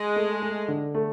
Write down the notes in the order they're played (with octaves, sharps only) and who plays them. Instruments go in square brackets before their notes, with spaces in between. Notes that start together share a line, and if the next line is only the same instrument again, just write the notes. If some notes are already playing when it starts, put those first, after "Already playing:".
Already playing: [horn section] G#3
[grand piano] A3
A3
D3
A3